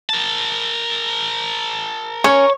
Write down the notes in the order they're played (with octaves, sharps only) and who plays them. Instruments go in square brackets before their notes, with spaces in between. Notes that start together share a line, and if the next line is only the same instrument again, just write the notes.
[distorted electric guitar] A#4 A5
[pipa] C#4 [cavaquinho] C#5 [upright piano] C#6